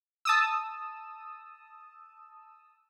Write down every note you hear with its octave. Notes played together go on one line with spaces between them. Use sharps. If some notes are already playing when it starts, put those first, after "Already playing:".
A5 D#6 E6